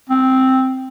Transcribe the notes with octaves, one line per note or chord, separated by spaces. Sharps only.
C4